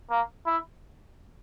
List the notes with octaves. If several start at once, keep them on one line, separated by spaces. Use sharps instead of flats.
A#3
E4